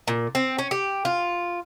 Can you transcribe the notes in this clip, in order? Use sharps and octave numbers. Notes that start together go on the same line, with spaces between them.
A#2
C4
C#4
G4
F4